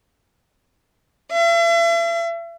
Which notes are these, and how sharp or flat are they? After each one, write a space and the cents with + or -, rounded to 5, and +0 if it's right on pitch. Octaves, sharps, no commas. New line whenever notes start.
E5 +40